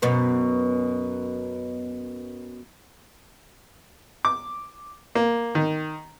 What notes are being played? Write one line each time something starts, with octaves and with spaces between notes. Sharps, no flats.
F#2 B2 B3
D6
A#3
D#3